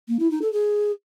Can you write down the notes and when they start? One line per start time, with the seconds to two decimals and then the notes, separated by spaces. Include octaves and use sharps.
0.08 A#3
0.19 E4
0.30 D#4
0.41 A4
0.52 G#4